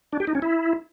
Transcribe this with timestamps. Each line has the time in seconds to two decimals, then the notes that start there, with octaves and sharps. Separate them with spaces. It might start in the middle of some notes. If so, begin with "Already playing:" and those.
0.13 D4
0.20 G4
0.27 D#4
0.35 C#4
0.42 E4